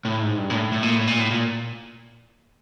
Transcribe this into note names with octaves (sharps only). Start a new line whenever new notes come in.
A2
G#2
G2
A#2
A2
A2
A#2
A2
A#2
A2
A#2